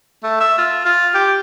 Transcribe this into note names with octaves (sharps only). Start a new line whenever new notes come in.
A3
E5
F4
F4
G4